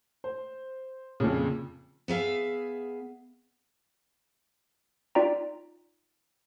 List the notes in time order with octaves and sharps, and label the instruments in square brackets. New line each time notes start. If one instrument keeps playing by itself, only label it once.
[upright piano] C5
F2 A#2 C#3
[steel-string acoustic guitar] B3 G#4 E5 F5
[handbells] D#4 F4 D5 G5 A#5